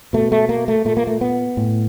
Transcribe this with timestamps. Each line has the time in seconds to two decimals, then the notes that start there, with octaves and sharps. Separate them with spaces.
0.13 B2 A3
0.32 A3
0.49 A#3
0.68 A3
0.85 A#2 A3
0.97 A#3
1.07 A3
1.21 B3
1.57 A2